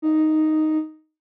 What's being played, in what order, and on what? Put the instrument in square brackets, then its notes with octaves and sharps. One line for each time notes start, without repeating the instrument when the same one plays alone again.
[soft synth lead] D#4